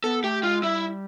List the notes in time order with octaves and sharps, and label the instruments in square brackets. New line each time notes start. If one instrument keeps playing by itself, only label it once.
[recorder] B3 [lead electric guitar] A4
[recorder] A3 [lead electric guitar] G4
[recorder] G#3 [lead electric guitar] F4
[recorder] G3 [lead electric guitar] E4